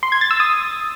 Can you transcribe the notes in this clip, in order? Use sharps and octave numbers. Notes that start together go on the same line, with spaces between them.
C6
G#6
A6
E6
D#6